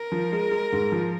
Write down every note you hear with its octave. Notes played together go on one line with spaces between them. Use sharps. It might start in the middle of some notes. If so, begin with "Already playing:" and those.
Already playing: A#4
F3
G#3
G#3
G#2
F3